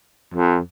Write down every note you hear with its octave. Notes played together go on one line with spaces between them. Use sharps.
F2